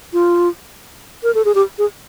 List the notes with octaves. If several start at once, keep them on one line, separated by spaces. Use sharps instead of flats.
F4
A#4
A4
G#4
G4
G#4